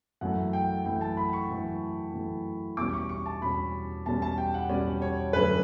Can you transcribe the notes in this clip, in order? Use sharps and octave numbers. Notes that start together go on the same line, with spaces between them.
F#2 E3 A3 F#5
G5
F#2 E3 A3 G5
A5
B5
C#6
F#2 E3 A3
F#2 E3 A3
E2 B2 G3 C#4 D6
C#6
C#6
A5
E2 B2 G3 C#4 B5
E2 B2 G3 C#4 A5
A5
G5
F#5
E2 B2 G3 C#4 D5
C#5
F#2 D3 A3 C#4 B4